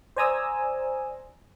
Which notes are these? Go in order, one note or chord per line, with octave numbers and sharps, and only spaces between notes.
C5 D5 G#5 A#5 D#6 E6